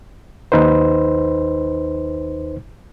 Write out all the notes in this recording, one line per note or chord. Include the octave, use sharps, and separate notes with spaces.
D#2 D#4 B4 C5